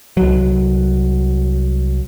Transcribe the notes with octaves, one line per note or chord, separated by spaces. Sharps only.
C2 F#3